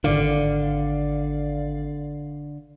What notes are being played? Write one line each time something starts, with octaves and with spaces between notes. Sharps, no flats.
G#1 D3 D5 F5